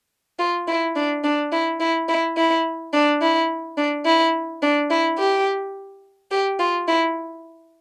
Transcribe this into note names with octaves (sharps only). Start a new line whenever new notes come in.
F4
E4
D4
D4
E4
E4
E4
E4
D4
E4
D4
E4
D4
E4
G4
G4
F4
E4